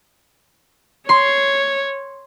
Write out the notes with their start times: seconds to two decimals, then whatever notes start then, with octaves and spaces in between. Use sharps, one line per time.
1.09 C#5 C6